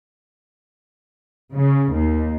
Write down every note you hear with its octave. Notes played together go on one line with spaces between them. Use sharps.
C#3
D#2